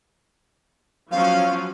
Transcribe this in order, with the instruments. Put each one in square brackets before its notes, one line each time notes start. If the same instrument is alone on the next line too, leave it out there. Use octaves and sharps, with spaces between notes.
[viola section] F3 F#3 C#4 [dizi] F5